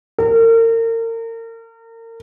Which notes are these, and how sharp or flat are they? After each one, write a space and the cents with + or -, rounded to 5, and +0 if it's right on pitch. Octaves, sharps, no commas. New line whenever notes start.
A#4 -35